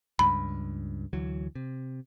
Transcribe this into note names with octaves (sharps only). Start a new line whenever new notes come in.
C#2 G2 B5
D2 E3 F#3
C3